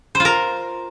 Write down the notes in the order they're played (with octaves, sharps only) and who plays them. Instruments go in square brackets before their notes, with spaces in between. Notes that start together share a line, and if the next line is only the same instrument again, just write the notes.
[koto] C5
F4
A#4